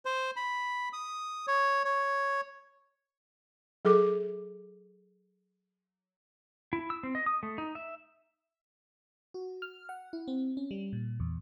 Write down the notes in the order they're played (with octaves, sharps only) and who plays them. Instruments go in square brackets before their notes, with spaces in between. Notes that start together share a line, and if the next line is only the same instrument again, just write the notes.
[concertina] C5
B5
D#6
C#5
C#5
[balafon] F#3 G#4 A4 D6
[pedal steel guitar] E4
E6
C4
D#5
D#6
A3
D#4
E5
[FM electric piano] F#4
F6
F#5
E4
C4
C#4
G3
A#2
E2